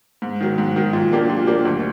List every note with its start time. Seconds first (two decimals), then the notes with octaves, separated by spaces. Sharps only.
0.22 G#2
0.41 D#3 F#3
0.58 G#2
0.76 D#3 F#3
0.93 A#2
1.12 F#3 A#3 D4 G4
1.30 A#2
1.47 F#3 A#3 D4 G4
1.65 D2